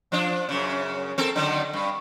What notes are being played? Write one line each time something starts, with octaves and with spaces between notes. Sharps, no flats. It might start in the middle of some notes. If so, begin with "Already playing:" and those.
F3 D4
F#2 C#3
C4 A4 A#4
D3 D#3 F#3
G2